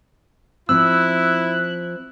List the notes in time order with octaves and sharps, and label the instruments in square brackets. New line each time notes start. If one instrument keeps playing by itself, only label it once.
[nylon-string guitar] F3 C4 [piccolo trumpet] E4 [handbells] E6 [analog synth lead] F#6